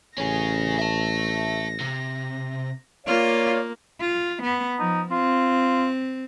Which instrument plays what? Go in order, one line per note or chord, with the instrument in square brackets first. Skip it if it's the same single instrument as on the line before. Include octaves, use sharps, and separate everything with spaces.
[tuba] A1 [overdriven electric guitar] C#4 G#4 [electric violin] A#6
[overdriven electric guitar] E5 A5
C3
[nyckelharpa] A#3 [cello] F4 [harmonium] C#5 D5 F5
[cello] F4
B3
[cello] F3 [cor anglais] D#4
[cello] C4 [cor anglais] F4